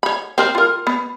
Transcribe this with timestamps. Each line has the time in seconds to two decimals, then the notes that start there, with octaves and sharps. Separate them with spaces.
0.03 C#5 B5
0.38 C4 A#4 C5
0.55 F4 A#4
0.87 B3